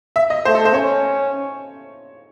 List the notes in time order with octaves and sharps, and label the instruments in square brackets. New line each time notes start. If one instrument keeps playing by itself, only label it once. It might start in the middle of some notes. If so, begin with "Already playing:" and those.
[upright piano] E5
D#5
[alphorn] A3 [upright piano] C5
[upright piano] A4
C5
[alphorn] C#4 [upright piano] C#5